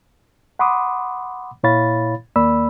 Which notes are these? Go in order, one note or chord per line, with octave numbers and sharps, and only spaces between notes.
F#5 B5 C6 D6 D#6
A#2 E4 C#5 F5 B5 A6
D#2 A#3 D5 B5 E6